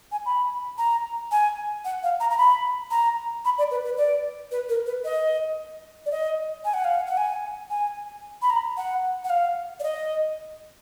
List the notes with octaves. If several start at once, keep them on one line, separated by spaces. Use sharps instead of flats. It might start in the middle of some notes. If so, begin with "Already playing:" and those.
G#5
B5
A#5
G#5
F#5
F5
A#5
A#5
B5
A#5
B5
D5
B4
B4
D5
B4
A#4
B4
D#5
D5
D#5
G#5
F#5
F5
F#5
F#5
G#5
G#5
B5
A#5
F#5
F#5
F5
D5
D#5